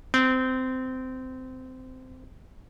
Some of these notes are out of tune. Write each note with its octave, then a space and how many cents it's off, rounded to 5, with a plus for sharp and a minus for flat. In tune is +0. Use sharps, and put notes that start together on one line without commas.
C4 -20